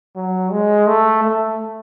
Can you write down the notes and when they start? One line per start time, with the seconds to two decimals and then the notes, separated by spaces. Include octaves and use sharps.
0.16 F#3
0.52 G#3
0.87 A3
1.24 A3